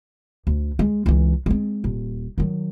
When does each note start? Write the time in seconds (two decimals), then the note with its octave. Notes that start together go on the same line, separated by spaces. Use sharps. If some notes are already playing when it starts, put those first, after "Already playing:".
0.47 D2
0.79 G#3
1.06 C#2 E3
1.46 G#3 C4
1.84 D#1
2.38 D#3 F#3